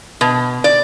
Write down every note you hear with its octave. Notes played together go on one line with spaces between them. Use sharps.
B2
D5